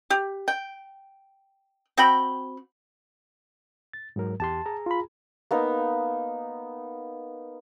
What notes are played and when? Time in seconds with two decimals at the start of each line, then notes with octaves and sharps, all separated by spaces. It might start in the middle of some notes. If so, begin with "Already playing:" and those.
0.10 G4
0.48 G5
1.97 C4 F#4 G5 B5
3.93 A6
4.16 G#2 F#3 A#4
4.40 E2 G4 A5 C6
4.66 G#4 A#5
4.86 F4 B5
5.51 A#3 B3 D#4